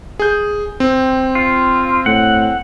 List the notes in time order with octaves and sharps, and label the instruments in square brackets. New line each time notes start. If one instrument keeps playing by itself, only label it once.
[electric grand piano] G#4 G6
C4
[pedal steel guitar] F4
[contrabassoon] A2 [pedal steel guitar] F#5